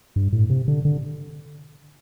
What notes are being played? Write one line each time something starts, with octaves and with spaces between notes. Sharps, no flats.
G2
A2
C3
D3
D3